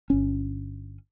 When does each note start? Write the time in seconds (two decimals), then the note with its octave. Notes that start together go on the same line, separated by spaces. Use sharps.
0.10 G1 C#4